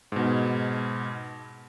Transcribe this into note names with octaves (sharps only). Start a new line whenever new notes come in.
G#2 B2